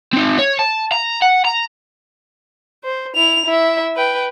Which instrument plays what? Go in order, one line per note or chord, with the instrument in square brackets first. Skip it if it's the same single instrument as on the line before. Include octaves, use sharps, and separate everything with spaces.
[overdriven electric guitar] C4 D#4
C#5
A5
A#5
F#5
A#5
[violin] C5
E4 F7
E4 E5
B4 G5